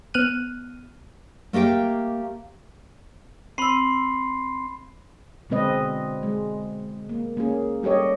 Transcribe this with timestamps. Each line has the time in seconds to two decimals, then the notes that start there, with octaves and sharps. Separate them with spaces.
0.14 B3 F6 F#6 D#7
1.53 A3 A#3 G4 F5 G5
3.58 C4 B5 C6 E6 C7
5.50 B2 D3 G#3 C4 B4 D#5
6.23 G#3
7.09 A#3
7.37 A#3 C#4 G#4
7.83 G3 G4 A4 C#5 D#5